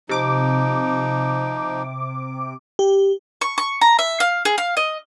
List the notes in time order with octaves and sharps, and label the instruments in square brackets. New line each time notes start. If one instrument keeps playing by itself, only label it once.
[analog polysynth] C3 D6 [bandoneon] F3 D#4
[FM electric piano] G4
[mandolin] C#6
C#6
A#5
E5
F5
G#4
F5
D#5